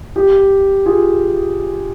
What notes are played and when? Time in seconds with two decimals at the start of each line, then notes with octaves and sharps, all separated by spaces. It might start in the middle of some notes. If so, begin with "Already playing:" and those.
0.16 G4
0.86 F4 G#4